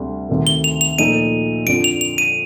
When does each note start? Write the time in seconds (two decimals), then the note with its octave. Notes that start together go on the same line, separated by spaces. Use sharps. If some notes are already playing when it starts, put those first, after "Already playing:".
Already playing: D2 C3 G3 D4 A4
0.29 D2 C3 D#3 A3
0.47 G7
0.64 F7
0.81 F7
0.98 A#2 F3 A3 D#4 A4 D#7
1.66 F2 D3 F3 D7
1.84 F7
2.01 F7
2.18 D#7